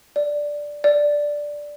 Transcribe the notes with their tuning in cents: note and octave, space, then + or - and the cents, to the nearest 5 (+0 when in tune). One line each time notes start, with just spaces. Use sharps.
D5 +0
D5 +0